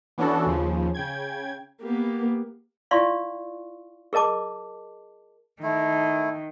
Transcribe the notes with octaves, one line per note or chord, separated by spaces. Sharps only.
E3 B3 C#4 D4 F#4 A4
D#2 C#3 F3
C#3 G5 G#6
A#3 B3 G4
E4 F4 D5 F5 C6 C#6
G#4 A#4 D#5 A5 D6
D#3 A3 E4